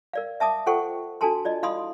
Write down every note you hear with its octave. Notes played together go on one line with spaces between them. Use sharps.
A#4 D5 F5
E5 A5 D6 D#6
F4 A4 C5 F#5 G5 C#6
D4 F#4 A4 G#5 A5 C6
F4 D5 D#5
E4 F5 B5 C6 D#6